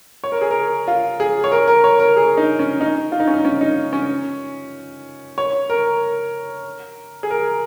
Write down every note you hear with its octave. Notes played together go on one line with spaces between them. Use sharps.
C#5
A#4
G#4
A#4
F4
G#4
C#5
A#4
A#4
C#5
A#4
G#4
D#4
C#4
D#4
F4
D#4
C#4
D#4
C#4
D#4
C#4
C#5
A#4
G#4
A#4